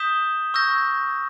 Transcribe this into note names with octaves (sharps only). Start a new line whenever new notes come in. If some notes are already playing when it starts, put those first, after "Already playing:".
Already playing: D#6 G6 B6 E7 G7
C#6 E6 G6 A#6